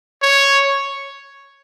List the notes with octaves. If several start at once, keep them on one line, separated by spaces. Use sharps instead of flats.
C#5